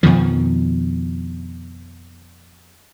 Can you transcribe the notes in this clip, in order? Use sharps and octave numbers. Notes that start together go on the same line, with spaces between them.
F2 B2 D#3 F3